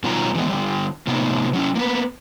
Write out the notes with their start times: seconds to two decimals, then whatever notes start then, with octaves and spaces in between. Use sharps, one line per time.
0.04 B2 D#3 F#3 G3 F4 A#5
0.35 D3 E3 G#3 B3
0.50 D3 G3
1.07 A2 C3 F#3 A#3 B3 D#4
1.53 F#3 C#4 E4
1.75 A#3 B3 B4